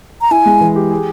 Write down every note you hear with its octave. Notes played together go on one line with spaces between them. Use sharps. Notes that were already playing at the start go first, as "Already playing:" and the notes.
A#5
E4 G#5
G#3
E3
G4
G#4